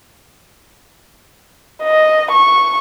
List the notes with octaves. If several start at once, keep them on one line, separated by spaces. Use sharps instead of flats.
D#5
C#6